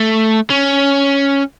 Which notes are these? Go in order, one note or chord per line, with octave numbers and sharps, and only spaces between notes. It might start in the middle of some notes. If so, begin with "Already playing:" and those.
Already playing: A3
C#4